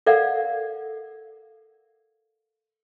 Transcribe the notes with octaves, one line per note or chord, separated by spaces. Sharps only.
A4 A#4 D5 F5 F#5